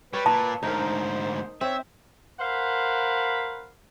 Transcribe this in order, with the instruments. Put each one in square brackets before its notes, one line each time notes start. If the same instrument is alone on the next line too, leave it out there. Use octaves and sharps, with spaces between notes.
[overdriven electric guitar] G3 [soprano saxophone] B4 [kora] C#5
[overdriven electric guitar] A#2 [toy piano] A5
[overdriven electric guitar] D2 G#2 [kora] D#4 A#4 [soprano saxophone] C5
[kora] C4 [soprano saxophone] C#5 [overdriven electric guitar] E5
[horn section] A#4 C5 F5 F#5 B5